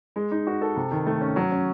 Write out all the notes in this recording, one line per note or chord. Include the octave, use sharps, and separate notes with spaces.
G#3
D#4
F#4
A4
C3
D#3
A3
C#4
F#3
C#4